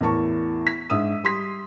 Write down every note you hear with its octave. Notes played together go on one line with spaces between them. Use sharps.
E2 A2 A#4 A5 C#6
B6
G#2 D4 E5 D#6 E6 D#7
G3 C6 B6